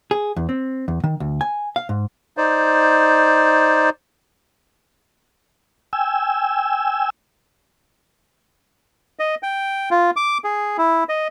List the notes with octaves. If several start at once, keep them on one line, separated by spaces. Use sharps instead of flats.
G#4
E2
C4
E2
D#3
D2
G#5
F5
G#2
D#4 C5 D5
G5 G#5 E6
D#5
G5
F4
D6
G#4
E4
D#5